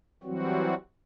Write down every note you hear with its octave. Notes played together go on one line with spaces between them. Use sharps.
E3 F#3 G3 C4 F#4